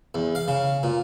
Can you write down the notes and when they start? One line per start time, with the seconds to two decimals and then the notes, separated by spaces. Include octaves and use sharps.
0.15 E2
0.35 F5
0.48 C#3
0.83 A#2